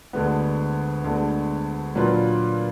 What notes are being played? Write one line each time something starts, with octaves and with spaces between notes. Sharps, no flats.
D2 D3 G#3 B3
D2 D3 G#3 B3
A#2 F#3 D4 F4 B4